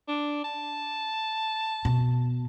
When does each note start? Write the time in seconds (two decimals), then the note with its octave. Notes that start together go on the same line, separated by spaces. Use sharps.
0.08 D4
0.44 A5
1.85 B2